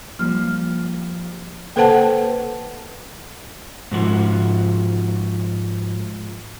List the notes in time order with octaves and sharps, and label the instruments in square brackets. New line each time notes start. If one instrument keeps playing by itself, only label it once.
[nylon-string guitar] F3 G3 C5 [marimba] A#3 F6
[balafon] A#3 A4 B4 C5 F#5 A5
[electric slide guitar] G#2 F3 F#4